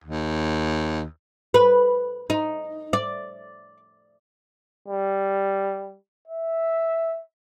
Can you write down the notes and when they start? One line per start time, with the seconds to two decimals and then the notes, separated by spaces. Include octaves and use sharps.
0.04 D#2
1.54 B4
2.30 D#4
2.93 D5
4.88 G3
6.28 E5